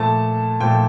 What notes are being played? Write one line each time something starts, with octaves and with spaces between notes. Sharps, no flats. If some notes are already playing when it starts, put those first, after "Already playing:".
Already playing: A#2 F3 A3 A5
A#2 F3 A3 G5